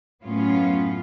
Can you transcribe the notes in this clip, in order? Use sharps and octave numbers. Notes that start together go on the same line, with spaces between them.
F#2 A2 B3 C#4 F4